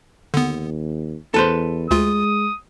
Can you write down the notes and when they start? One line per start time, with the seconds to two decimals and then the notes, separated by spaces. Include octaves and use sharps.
0.34 D#2 D3 B3
1.34 E2 A4 B4 C5
1.91 D2 G#3 F4 D#6